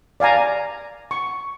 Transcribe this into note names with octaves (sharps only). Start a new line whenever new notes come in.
D5 F5 G#5 A#5
C#6